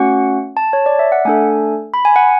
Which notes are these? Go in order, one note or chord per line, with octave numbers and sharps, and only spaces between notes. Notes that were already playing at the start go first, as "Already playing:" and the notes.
Already playing: A3 C#4 F#4 F#5
A5
C#5
D5
E5
F#5
A3 D4 A4 G#5
B5
G#5
F#5